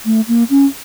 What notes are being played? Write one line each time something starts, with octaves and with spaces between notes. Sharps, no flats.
A3
A#3
C#4